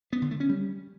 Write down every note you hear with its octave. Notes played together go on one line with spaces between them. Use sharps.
B3
D3
A3
C#4
G3